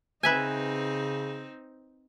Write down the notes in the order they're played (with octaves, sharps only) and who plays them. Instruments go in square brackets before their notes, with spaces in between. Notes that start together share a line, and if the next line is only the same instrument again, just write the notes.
[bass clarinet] C#3 [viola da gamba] C4 D#4 [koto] B4 E5 G#5